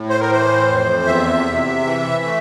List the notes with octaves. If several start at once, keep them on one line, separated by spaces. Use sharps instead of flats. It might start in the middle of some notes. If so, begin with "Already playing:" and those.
Already playing: A2
C5
A#4
E3 C5
F2
E2 E5
C3
E3
A3